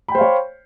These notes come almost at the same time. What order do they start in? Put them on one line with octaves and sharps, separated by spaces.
B5 G5 C5 F5 C#5